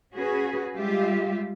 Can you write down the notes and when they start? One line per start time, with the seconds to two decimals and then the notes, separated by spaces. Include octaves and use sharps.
0.14 C#4 F#4 G#4 B4
0.75 G3 G#3 F4 G4 E5